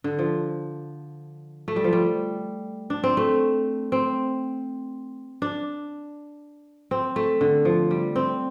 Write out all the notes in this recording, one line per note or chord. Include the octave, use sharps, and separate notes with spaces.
D3
F3
A3
G3
F3
G3
D4
C4
A3
C4
D4
C4
A3
D3
F3
G3
C4